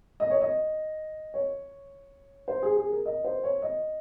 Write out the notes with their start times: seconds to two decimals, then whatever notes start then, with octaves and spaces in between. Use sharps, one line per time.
0.20 D#5
0.30 C#5
0.41 D#5
1.34 C#5
2.48 C5
2.63 G#4
2.77 G#4
2.91 A#4
3.06 D#5
3.25 C5
3.44 C#5
3.62 D#5